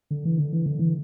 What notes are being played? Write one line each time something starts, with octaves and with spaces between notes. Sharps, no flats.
D3
E3
D3
E3
D3
E3